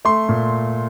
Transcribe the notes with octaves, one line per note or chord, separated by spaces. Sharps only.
A3 C6
A#2